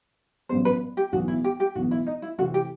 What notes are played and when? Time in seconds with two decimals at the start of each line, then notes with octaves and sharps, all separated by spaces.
0.49 A1 G2 F#3 B3 C5
0.65 B4
0.97 G4
1.12 B1 A2 E3 B3 F#4
1.28 E4
1.44 G4
1.60 G4
1.75 B1 A2 E3 B3 F#4
1.91 E4
2.06 D#4
2.22 E4
2.38 C3 E3 A3 C4 F#4
2.54 G4